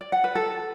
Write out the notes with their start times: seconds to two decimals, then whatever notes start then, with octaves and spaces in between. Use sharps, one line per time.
0.01 D5
0.12 F#5
0.24 B4
0.35 A4